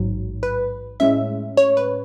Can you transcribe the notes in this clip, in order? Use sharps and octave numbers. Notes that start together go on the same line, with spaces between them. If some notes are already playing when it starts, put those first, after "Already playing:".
Already playing: A1 G#2 F#3
B4
A2 G#3 C#4 E5
C#5
B4